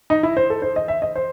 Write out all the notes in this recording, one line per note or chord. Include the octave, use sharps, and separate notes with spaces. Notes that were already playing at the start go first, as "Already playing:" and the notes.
D#4
E4
C5
A4
C5
D#5
E5
D#5
C5